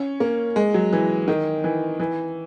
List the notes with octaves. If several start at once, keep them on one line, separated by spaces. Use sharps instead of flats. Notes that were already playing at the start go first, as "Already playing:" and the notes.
Already playing: C#4
A#3
G#3
F#3
E3
D#3
E3
E3